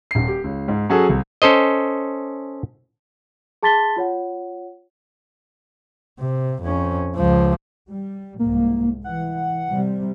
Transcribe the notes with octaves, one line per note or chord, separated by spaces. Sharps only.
D#1 C7
G4
C#2
G#2
F#3 C#4 F#4 G#4 A4
C2
C#4 A4 C5 D#5
G#4 A5 C6 A6 B6 G7
F4 C#5 F#5
C3
F2 C#4
C#2 F3
G3
C2 G#2 A#3
E3 F#5
C3 G3